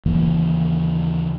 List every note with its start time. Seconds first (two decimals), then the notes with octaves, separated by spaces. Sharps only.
0.06 D#2 C#3 E3 A#3